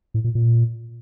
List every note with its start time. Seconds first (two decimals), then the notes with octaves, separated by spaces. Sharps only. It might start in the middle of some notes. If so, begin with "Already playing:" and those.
0.14 A2
0.24 A#2
0.35 A#2